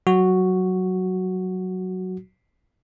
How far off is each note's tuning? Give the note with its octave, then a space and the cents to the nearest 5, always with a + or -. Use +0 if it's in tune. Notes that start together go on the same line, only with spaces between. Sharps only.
F#3 +5 F#4 +0